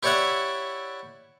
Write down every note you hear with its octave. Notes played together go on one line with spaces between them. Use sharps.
E4 G4 C#5 D5 E5 F#5